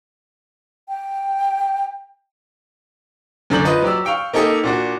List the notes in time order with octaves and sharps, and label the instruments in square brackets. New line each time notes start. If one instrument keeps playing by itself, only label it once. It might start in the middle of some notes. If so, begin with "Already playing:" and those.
[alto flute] G5
[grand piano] F#2 D3 D5 G6 F#7
F4 B4 D#5
F#3 G4 D5 E6
F5 G5 C#6
A#3 D#4 G4 A4 D#5
A#2 D4 F#4